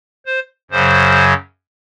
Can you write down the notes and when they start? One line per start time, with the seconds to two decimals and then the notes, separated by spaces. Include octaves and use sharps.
0.26 C5
0.71 F#2 C#3 F#3 C5